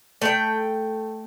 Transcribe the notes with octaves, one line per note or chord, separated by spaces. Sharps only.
A3 G5